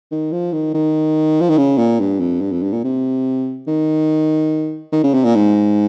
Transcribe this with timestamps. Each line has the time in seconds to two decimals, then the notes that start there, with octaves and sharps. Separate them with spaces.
0.11 D#3
0.32 F3
0.53 D#3
0.74 D#3
1.41 F3
1.50 D#3
1.58 C#3
1.78 A#2
2.00 G2
2.20 F2
2.41 G2
2.52 F2
2.63 G2
2.73 A#2
2.84 C3
3.67 D#3
4.92 D#3
5.03 C#3
5.14 C3
5.24 A#2
5.35 G#2